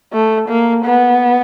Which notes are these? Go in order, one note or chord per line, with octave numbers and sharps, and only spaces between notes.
A3
A#3
B3